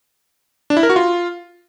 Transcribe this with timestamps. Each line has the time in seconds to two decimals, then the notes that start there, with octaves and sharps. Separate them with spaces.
0.70 D4
0.77 E4
0.83 A#4
0.90 F#4
0.96 F4